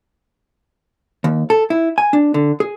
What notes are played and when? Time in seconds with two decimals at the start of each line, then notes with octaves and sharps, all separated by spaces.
1.24 D#2
1.50 A4
1.70 E4
1.98 G#5
2.13 D4
2.34 D3
2.60 G#4